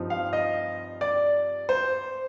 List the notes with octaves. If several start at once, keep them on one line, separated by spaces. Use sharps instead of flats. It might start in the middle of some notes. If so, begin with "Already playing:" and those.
Already playing: G2 F3 C4 D#4
F5
D#5
D5
C5